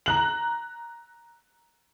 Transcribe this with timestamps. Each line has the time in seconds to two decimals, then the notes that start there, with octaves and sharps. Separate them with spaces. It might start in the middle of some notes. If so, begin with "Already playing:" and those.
0.06 A#5 F#6 F#7